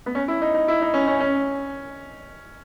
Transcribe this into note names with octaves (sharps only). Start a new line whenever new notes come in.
B3
C#4
E4
D#4
D#4
E4
D#4
C#4
C#4
C#4